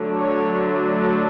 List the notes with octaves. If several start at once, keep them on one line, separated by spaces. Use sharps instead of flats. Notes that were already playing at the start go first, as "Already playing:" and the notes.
Already playing: D3 F#3 A3 D4
C#5